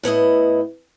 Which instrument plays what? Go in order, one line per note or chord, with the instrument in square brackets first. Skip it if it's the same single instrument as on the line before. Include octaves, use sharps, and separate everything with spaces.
[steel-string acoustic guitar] A2 B3 E4 D#5